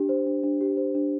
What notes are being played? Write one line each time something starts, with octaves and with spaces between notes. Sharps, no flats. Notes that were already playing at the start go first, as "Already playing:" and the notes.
Already playing: D4 G4
C5
D4
D4
G4
C5
D4